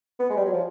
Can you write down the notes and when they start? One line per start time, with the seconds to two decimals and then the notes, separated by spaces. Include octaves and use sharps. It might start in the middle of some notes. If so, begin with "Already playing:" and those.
0.19 B3
0.30 G#3
0.37 G3
0.45 F#3
0.53 F3